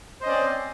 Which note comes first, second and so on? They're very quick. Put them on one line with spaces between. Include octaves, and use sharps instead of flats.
C5 D#5 C#4 D5 C4